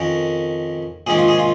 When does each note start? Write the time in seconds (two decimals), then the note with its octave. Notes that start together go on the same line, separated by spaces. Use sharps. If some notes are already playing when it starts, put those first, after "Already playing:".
Already playing: F2 D#3 C#4 A#4
1.07 A#1 G#2 D#3 C#4 G#4
1.18 F4
1.28 G#4
1.39 F4